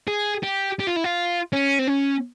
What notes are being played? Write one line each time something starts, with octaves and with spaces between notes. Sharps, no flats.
G#4
G4
G4
F4
E4
F4
C#4
C4
C#4